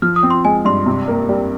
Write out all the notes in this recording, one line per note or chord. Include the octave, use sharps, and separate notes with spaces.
F3 F6
D#6
C4
C6
G#3 G#5
G2 C6
C3
A#3
G3